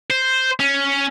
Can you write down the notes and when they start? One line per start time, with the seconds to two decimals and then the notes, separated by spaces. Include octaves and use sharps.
0.10 C5
0.60 C#4